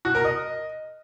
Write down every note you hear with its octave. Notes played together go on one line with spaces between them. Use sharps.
F#4
A#4
D#5